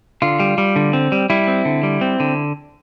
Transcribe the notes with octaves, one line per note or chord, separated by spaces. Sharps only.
D3 F4
G3
G3
D3
C4
G3
G3 E4
C4
D3
G3
C4
D3